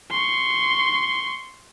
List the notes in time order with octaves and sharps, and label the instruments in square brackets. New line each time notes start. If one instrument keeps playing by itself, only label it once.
[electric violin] C6 C#6